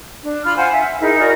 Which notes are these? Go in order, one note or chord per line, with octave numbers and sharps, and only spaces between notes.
D4
F4 B5 F6
C5 F5 F#5 G#5
E5
D#4 E4 G#4 A#4
F#4 A#4 D5